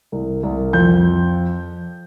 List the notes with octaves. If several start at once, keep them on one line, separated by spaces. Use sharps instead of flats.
C2
C2
F2 G6